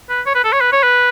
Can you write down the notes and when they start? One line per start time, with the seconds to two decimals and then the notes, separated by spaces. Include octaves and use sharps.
0.09 B4
0.26 C#5
0.35 B4
0.44 A4
0.53 C#5
0.61 B4
0.72 C#5
0.83 B4